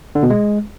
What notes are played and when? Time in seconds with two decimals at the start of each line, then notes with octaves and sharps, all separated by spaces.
0.15 D3
0.23 B2
0.30 G#3